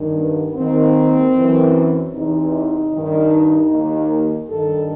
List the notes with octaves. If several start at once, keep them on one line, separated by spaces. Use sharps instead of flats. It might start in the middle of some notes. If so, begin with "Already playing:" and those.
Already playing: G2 D#3
B3
D#2 D#3 C4
F#2 E3
E2 C3 E3 D#4
G2 D#3
D#2 D#3
G2 D#3 A4